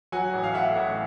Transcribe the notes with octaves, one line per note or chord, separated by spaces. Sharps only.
F#3 F#5 G#5
A1
F5
A2 E5 F#5
A1